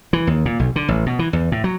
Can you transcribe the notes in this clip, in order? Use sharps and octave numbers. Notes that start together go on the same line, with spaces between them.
E3
D#2
A#2
B1
D3
A1
B2
E3
E2
A2
F#3